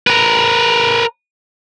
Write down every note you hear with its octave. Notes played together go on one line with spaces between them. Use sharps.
A#4 B4